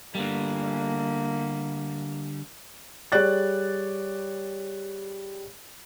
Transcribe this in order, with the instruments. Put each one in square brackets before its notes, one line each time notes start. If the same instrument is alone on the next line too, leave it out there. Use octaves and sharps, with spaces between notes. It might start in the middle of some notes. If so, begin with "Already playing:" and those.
[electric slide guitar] D3 G3 [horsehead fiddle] A#3
[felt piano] G3 G#4 C#5 D5 F#6 A6